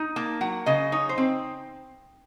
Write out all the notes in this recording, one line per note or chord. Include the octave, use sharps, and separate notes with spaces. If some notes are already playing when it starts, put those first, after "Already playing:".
Already playing: D#4
A#3 A5
F#3 F#5
C#3 D#5
D#4 C#5
C5
C4